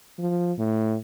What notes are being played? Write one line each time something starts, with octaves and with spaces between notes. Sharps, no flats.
F3
A2